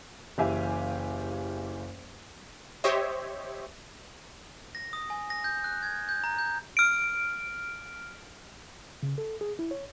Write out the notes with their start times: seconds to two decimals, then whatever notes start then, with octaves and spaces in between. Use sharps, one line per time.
0.38 F#1 E3 G4 E5 F5 G#5
2.84 G4 C5 C#5 D#5 E5
4.75 A#6
4.93 D#6
5.10 G#5
5.30 A#6
5.44 G6
5.64 F#6
5.82 G#6
6.09 G6
6.24 A#5
6.38 G6
6.77 F6 D7
9.03 C#3
9.18 A4
9.41 G#4
9.59 E4
9.71 C#5